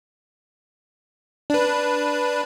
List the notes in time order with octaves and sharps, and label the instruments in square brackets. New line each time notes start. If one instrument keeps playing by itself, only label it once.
[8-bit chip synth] D4 B4